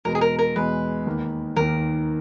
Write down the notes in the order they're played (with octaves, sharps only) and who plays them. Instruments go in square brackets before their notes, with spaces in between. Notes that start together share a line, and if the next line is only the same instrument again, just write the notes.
[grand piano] E2 B2 G#3 [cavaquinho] A#4
[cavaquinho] G#4
A#4
A#4
[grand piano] E2 B2 G#3 [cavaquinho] B4
[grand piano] D#2 D#3 A#3
[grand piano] D#2 D#3 A#3 [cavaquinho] A#4